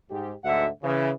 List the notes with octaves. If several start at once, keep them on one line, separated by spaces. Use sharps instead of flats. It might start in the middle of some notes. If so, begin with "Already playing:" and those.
G#2 G4
D2 G#2 D3 F#4 E5 F#5
C#3 E3